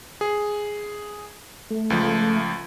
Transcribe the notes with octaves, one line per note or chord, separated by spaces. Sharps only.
G#4
A3
C#2 F3